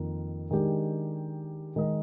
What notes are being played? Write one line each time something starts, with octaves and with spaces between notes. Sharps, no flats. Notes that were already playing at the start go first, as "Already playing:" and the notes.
Already playing: F2 D#3 A#3
D#3 G#3 D4 G4
D#3 G#3 D#4 A#4 D#5